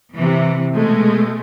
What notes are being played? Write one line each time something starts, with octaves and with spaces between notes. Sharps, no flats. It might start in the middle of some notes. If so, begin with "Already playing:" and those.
C3 E3
B2 G#3 A3